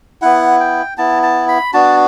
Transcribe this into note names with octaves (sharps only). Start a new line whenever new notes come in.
B3 E4 F#5
G5
B3 E4 A5
A5
B5
B3 D4 F#4 A5